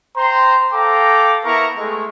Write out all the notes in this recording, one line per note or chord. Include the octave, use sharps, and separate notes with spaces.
C5 G5 A#5 C6
A4 F5 G5 A#5 D6
B3 E4 A#4 A#5 C#6
G#3 A3